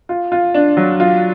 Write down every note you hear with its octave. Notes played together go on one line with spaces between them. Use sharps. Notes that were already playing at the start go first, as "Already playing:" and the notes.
F4
F4
D4
F#3
F4